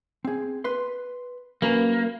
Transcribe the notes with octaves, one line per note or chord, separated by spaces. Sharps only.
C4 G#4
B4 C6
F#3 A#3 C#4 B4